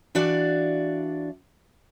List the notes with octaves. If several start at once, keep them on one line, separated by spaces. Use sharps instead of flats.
E3 D4 F#4 D5 F5